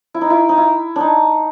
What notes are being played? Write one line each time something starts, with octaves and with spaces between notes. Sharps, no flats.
E4
D#4
E4
D#4
E4
D4 D#4